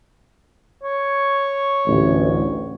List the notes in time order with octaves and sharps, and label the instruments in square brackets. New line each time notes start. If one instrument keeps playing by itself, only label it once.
[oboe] C#5
[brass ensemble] A1 D2